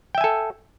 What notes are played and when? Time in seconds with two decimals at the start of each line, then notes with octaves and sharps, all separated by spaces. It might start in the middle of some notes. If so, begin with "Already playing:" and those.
0.15 G5
0.18 E5
0.21 G#5
0.24 A4